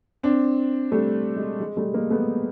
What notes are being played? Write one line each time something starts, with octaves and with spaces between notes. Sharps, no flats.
C4 D4
G3 A3
G#3
G#3
G3 A3
G#3 A#3
A3 B3